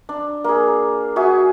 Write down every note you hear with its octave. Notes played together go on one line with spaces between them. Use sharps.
D4
A#3 G#4
F#4 G#4 E5